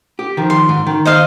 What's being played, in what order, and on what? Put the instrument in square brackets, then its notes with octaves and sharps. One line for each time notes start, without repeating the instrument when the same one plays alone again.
[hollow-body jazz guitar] G4
D#3 F3
[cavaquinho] C6
[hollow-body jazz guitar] G#2
D#3
[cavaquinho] C5 D#5 F5